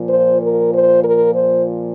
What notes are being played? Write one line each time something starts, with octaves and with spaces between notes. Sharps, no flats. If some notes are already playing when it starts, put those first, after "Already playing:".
Already playing: A#2 F3
C5
A#4
C5
A#4
C5